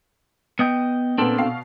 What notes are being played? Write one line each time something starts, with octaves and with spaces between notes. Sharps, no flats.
B3 D#5 G5
A#2 B3 C4 D4 A4
B2 F5 C7